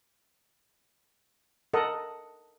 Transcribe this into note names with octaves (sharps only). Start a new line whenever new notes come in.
A4 A#4 D#5 F#5